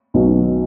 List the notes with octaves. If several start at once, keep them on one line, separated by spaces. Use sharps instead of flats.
B1 B2 F#3